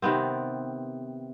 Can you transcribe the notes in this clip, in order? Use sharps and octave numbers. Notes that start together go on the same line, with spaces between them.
C3 D#3 B3 C4